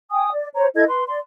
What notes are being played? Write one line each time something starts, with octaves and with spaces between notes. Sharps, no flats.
G5 G#5 D#6
D5
C5 C#5 A#5
E4 A4 D#5 G#6
B4 C6
D5 C6